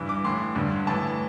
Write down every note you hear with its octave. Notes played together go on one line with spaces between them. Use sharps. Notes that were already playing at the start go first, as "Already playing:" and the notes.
Already playing: G2 E3
D6
A2 E3 C6
G2 D3
A2 E3 A5